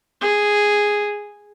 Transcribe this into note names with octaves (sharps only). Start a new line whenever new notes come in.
G#4